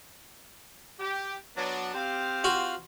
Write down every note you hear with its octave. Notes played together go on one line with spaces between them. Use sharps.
G4
F#3 B3 D4
C4 G4 F5
F4 F#4